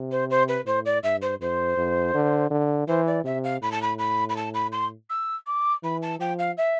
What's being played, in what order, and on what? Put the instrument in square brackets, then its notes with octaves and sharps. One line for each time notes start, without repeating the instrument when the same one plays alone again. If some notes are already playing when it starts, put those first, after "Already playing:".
Already playing: [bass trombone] C3
[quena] C5
C5
B4
[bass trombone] A2 [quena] C5
[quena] D5
[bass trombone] G2 [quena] E5
[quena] C5
[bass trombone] F2 [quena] C5
[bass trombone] F2
D3
D3
[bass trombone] E3 [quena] C5
[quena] D5
[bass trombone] C3 [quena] E5
[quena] F5
[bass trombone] A2 [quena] B5
[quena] A5
B5
B5
B5
A5
B5
C6
E6
D6
[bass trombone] E3 [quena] B5
[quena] A5
[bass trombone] F3 [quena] G5
[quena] F5
E5